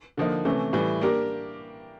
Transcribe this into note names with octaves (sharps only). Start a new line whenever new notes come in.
D3 F3 A#3 D#4
C3 E3 A3 C#4
A2 E3 G3
A#3 D4 G4 A#4